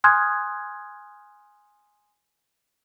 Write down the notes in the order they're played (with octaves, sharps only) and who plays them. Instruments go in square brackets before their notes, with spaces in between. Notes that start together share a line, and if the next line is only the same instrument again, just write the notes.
[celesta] G#5 C6 D#6 F6 F#6 G#6